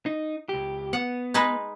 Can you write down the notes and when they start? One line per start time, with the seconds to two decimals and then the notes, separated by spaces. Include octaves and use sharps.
0.06 D#4
0.49 C#2 G4
0.93 B3 F#5
1.34 G#3 D#4 B4